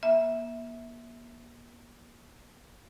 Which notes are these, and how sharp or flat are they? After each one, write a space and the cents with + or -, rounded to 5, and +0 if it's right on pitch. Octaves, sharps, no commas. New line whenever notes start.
A#3 +40 E5 -10